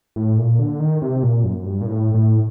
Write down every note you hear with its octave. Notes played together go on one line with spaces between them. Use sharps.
A2
A#2
D3
D#3
C3
A#2
F#2
G2
A#2
A2
A2